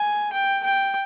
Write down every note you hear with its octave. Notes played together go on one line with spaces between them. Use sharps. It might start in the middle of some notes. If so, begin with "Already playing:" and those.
Already playing: G#5
G5
G5